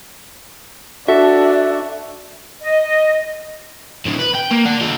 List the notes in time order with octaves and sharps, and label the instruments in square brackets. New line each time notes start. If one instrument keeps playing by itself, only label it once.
[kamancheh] D4 [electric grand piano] F#4 A4 [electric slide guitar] E5
[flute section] D#5
[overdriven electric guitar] A2 D3
B4
G5
A#3
D5 F#5
F4 G#4